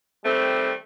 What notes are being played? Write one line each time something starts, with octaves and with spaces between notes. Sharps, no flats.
D#3 G3 A3 C4